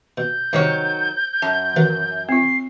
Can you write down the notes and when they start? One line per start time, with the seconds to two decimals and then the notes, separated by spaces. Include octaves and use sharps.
0.18 B2 G6
0.53 G2 C3 D#3 F#3 C5 C#5 F#5
1.42 F#2 A5
1.76 E3 F#3 A#4
2.29 C4 F4 C7